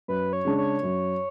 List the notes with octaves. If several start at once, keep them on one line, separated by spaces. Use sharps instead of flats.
F#2 B4
C#5
C#3 G#3 D4
C#5
F#2